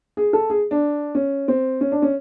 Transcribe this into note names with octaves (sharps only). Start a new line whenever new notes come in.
G#4
A4
G#4
D4
C#4
C4
C#4
D4
C#4